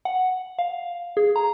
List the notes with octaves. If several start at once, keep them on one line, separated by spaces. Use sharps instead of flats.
F#5
F5
G#4
A#5